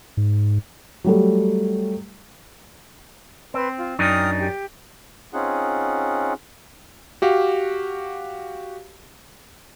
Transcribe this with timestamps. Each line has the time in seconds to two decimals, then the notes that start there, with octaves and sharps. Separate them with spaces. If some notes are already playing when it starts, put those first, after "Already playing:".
0.17 G#2
1.04 F#3 G3 A3
3.54 C4 B4 C6
3.78 F4
3.99 F#2 D4 D#4 G5 D#6 F6
4.40 G4
5.34 C4 C#4 D#4 F4 G#4 F#5
7.22 F#4 G4 F5